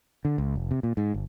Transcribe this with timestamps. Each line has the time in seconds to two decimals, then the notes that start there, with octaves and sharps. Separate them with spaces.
0.25 D3
0.38 C#2
0.56 F1
0.71 C3
0.83 A#2
0.97 G#2
1.14 G1